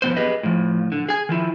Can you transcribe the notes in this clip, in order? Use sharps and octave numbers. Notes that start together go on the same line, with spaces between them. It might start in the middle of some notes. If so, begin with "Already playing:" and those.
F2 C3 B3 C5
G4 G#4 B4 D#5
A2 F3
D3
G#4 G#5
D#3 F3 E4